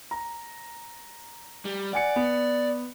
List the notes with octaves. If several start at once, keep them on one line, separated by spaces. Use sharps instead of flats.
A#5
G3
D5 F#5 G#5 C#7
B3